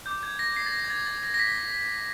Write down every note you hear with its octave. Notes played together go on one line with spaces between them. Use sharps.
D6 G6
G#6
A#6
C7
A6
A#6
G#6
A6
A6
A#6
A#6
B6